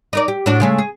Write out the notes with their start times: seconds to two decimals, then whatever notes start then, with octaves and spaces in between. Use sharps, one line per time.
0.13 D#4 A#4 D5
0.28 G4
0.46 A2 D4 F#4
0.60 C#3 G#3 A3
0.78 G#4